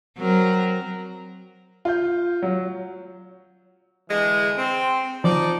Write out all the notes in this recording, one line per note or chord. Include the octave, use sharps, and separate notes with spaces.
F#3 C4 A#4
F4 G6
F#3
D3 E3 G#3
C4
F3 D#4 D5